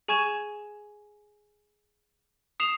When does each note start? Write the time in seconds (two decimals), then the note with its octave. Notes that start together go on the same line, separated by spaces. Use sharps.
0.08 G#4 G#5 C#6 G#6 E7
2.60 D#6 C7 E7 F7